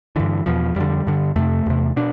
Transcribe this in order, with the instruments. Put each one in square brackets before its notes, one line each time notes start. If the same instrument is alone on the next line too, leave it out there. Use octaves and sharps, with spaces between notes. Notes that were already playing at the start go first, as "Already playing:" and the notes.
[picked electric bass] G2 D3 E3
E2 B2 F3
F2 D3 G3
G2 D3
F2 C3 A3
E2 C3
B2 D4